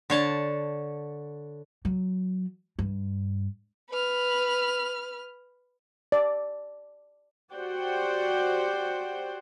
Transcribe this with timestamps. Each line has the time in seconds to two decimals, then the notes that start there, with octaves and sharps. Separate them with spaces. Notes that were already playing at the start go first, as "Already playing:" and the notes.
0.10 D3 C#5 A5
1.85 F#3
2.79 G2
3.90 B4 F6
6.12 D5
7.52 F#4 G4 C5 D5 F#5 G5